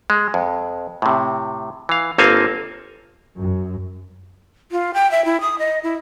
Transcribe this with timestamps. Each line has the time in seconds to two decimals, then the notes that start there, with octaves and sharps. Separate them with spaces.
0.10 G#3
0.34 F2
1.02 A2 C3
1.89 E3 F5
2.18 G1 A#3 C4 A4 F5 G#5
3.38 F#2
4.72 F4
4.94 G5
5.11 E5
5.25 E4
5.41 D#6
5.59 D#5
5.83 E4